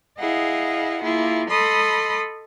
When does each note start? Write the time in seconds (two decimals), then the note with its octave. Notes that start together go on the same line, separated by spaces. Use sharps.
0.18 E4 G#4 D#5 F5 F#5
1.02 A#3 E4 F4 G#4
1.48 A4 D#5 B5 C6 D#6